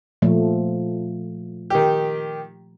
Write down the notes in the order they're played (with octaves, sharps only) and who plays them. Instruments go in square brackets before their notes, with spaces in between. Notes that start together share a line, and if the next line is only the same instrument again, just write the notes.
[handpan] A#2 F3 A3
[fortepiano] D#3 G4